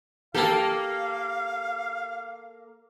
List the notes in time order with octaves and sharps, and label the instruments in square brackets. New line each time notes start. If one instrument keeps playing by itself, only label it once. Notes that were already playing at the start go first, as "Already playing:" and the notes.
[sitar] A#3 A4 [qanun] G4 A5 [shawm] F5